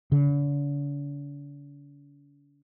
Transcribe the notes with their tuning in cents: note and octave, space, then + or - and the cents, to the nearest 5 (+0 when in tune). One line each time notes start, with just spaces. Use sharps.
D3 -45